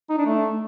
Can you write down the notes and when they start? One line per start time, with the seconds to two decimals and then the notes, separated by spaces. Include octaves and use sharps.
0.10 D#4
0.18 D4
0.27 A3